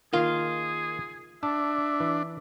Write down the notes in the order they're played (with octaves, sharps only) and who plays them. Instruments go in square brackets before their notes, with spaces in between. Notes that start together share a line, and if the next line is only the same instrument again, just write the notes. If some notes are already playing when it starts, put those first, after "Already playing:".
[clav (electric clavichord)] D#3 A#3 [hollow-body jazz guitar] F4 [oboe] G#4
[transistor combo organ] D4 [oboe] E5 [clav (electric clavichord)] A5
[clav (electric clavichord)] E3